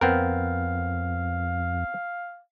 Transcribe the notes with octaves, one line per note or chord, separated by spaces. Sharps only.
F2 B3 C4 A#4 F5